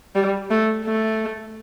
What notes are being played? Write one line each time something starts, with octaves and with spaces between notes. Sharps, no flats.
G3
A3
A3